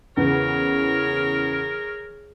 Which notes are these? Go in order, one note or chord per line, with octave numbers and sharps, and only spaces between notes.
E2 C#3 E3 G#4 A#4 C#5